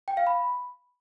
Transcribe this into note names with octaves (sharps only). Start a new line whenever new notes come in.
G5
F5
B5